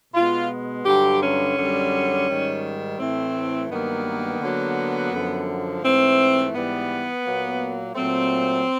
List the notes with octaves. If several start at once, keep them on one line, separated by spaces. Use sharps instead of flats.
B2 G#3 B3 F4
G2 D3 F#3 G4
C#4
F#2 D3 G3
G#2 D#3 G3
A2 E3 A3 C4
G2 D#3 F#3 A#3 B3
D3 F#3 A#3
F#2 D3 F3
G#2 E3 A3 C4
G#2 E3 G3 B3
A#2 F#3 A#3
A#2 F#3 A3 C4